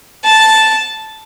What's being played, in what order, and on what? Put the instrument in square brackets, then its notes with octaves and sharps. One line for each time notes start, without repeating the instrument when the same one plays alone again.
[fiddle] A5